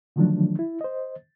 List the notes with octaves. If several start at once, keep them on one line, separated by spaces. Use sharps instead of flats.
D3 D#3 F3 F#3 A3 D4
E4
C5 D#5